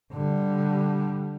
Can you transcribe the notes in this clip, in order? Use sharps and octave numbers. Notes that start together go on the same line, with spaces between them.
D3 G3